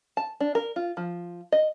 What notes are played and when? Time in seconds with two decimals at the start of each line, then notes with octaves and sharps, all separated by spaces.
0.17 A5
0.41 D4
0.55 A#4
0.76 F4
0.97 F3
1.52 D#5